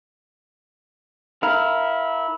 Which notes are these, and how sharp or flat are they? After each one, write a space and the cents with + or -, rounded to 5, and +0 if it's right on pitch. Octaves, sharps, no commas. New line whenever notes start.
E4 -15 A#4 +0 F5 +0